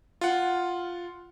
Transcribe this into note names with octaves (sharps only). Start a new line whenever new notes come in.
F4 F#5